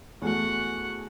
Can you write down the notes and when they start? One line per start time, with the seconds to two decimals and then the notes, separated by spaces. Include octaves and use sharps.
0.22 E2 A3 F#4 F#5